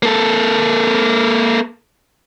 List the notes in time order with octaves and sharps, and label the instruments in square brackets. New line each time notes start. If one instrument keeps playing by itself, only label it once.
[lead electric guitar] A#3 A4